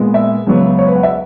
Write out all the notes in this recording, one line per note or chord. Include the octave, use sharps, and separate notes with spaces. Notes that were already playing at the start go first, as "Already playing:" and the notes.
Already playing: A#2 G#3 B3
E5
C#2 C#3 F#3 B3
C#5
B4
F#5
E5